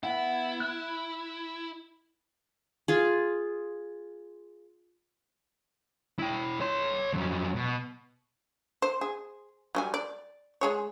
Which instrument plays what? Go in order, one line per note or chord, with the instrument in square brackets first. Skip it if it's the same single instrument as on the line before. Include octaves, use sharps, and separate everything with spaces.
[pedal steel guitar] B3 F#5 [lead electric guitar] E4
[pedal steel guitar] B5 F#6
[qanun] F4 G#4
[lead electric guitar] E4 G5
C#5 C6
F2 F#3
B2
[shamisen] C5
G#4
F#3 G3 G#5
D5
G#3 G#4 C#5